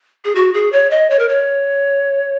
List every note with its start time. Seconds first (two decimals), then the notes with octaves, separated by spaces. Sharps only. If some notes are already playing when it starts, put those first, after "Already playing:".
0.25 G#4
0.35 F#4
0.54 G#4
0.72 C#5
0.91 D#5
1.10 C#5
1.19 A#4
1.29 C#5